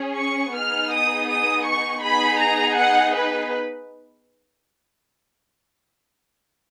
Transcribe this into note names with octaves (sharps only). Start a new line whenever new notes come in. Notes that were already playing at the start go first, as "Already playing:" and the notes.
Already playing: C#4 G#4
C#6
B3 D#4 G#4 F6
D#6
D#6
C#6
B3 D#4 G#4 B5
A#5
F#5
B4